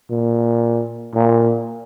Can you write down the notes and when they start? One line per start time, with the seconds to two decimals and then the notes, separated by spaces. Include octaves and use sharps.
0.10 A#2
1.15 A#2